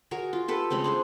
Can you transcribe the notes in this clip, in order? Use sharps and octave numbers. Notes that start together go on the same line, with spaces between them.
F#4 G#4 A#4 C#5
F4
G4 A4 B4
C#3 G#3 A3 C4
D4 G#4 C5